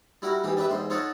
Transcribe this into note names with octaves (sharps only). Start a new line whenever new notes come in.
G3 E4 F#4 A#4
G#2 E3 G4
D4 G4 B4 E5
E2 G#2 C5
D#4 F4 A4 C#5 F#5 A5